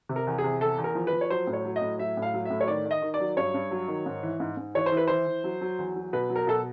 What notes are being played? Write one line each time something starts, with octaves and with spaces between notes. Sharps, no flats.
C3
A#4
E2
G#4
C3
E2 A4
E2
A#4
F3
B4
F3
C#5
F#3 C5
A2
C#5
F#3
D#5
A2
F#3 E5
A2
F5
F#3
A2 E5
C#5
D#3 D5
D#3
D#5
D#3
D5
F#3
G2 C#5
G2
F#3
D#3
G#2
E3
G#2
G#2
E3 C#5
C5
E3
B4
E3 C5
E3
F#3
F#3
E2
F#3
B2 B4
F#3
A#4
B2 A4